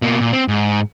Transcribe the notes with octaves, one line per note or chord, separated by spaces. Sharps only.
B2 A#3
A#2
C4
G#2